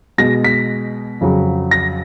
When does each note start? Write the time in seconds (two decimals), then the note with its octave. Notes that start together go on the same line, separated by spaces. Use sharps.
0.18 B2 G#3 A#6
0.44 B6
1.21 F2 C#3 F#3
1.71 A#6